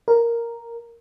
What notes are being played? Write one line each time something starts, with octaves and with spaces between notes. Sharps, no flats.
A#4